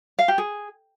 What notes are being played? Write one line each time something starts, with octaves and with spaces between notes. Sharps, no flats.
F5
G4
G#4